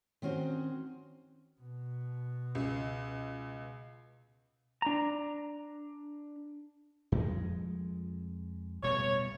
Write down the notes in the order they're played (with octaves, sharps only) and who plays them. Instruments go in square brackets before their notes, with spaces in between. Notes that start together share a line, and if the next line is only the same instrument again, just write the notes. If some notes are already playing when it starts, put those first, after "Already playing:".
[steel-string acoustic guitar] D#3 C4 C#4 F#4 C5
[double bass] B2
[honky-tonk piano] C#2
[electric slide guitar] D4 A#5
[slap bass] F2 G#3
[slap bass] D1 B2 G3 [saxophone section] C#5